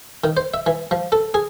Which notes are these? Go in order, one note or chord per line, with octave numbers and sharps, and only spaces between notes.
D#3
C5
E5
E3
F3
A4
G#4